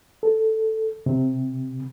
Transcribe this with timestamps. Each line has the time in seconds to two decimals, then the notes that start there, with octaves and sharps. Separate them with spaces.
0.23 A4
1.06 C3